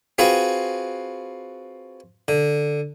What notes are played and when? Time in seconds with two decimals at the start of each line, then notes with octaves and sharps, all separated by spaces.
0.18 C4 F4 F#4 G#4 B4
2.28 D3